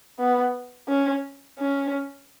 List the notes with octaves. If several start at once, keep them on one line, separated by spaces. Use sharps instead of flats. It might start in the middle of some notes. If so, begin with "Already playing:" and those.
B3
C#4
C#4